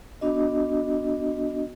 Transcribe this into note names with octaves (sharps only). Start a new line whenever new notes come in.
B3 D4 F#4 D#5